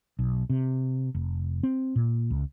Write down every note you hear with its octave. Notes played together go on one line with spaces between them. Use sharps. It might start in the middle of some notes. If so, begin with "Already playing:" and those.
B1
C3
F1
C4
A#2
C#2